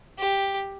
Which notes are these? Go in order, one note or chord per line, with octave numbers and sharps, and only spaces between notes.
G4